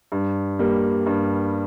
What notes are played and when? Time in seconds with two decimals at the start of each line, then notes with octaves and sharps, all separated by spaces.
0.12 G2
0.59 G3 A#3
1.06 G2